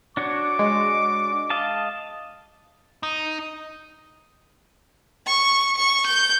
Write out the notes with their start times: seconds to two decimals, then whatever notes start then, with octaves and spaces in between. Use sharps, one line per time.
0.17 D4 F#4 C#5 D6
0.59 G#3
1.50 D#5 F5 A5
3.03 D#4
5.26 C#6
5.77 C#6
6.06 G6